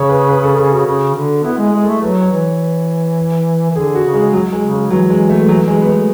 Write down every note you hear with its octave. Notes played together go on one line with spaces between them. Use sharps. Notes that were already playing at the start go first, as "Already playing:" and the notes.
Already playing: C#3 C#5
B4
B4
A4
G#4
F#4
C#3
D3
B3 E4
G#3
G#4
G#3
A4
A3
F#3 B4
C#5
E3
E3
D3 G#4
F#4
C#3
G#3
F#3
G#3
C#3
G#3
E3 F#3
G#3
A3
F#3
G#3
B3
A3